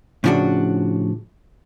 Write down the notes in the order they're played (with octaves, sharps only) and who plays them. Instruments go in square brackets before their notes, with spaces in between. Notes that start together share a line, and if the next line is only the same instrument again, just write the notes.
[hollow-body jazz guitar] A2 C#3 F3 D4 F#4